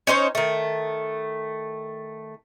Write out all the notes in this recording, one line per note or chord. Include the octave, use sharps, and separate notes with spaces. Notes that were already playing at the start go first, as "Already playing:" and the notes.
C#4 D#4 C5 C#5
D#3 A3